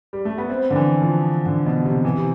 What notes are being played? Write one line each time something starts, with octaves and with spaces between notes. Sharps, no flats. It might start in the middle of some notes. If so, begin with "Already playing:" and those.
G3
A3
B3
C4
D3
E3
F3
D3
B2
C3
E3
C3